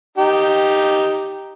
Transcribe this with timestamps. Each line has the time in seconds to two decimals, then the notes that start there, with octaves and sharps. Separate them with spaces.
0.18 D#4 G4